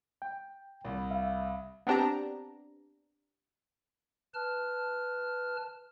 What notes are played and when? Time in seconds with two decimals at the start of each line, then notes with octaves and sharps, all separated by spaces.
0.22 G5
0.84 C2
1.11 E5 F5
1.87 B3 C4 D4 G4 A#5
4.34 B4 A5 F6